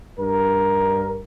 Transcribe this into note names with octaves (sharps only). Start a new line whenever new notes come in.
G2 A#4